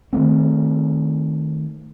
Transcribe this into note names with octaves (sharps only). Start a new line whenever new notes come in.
D#3 F#3 A3 C4